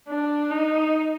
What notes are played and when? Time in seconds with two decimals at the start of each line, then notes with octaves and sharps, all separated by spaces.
0.08 D4
0.50 D#4